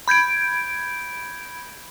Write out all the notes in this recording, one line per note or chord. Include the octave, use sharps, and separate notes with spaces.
B5 G6 G#6 D7